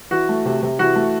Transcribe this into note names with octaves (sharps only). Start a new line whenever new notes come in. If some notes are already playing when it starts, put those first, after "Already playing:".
E3 F#4
A3
C3
C3
E3 F#4
A3